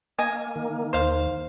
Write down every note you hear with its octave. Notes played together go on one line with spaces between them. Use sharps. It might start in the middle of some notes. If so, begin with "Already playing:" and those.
A#3 D#5 G#5
D#3
D#2 C5 F5